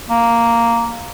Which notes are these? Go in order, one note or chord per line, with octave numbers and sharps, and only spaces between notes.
A#3